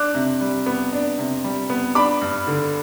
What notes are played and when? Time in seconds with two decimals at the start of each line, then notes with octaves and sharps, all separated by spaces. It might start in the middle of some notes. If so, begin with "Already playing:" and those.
Already playing: D4 D6 F#6
0.15 C3
0.41 G3
0.66 B3
0.93 D4
1.18 C3
1.44 G3
1.70 B3
1.95 D4 B5 D6
2.21 G2
2.47 D3